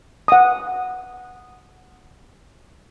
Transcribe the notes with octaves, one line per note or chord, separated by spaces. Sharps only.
F#5 D#6